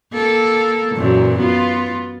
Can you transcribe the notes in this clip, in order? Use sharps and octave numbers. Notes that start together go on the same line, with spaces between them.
A#3 A4
F#2 A#2 E3
B3 F4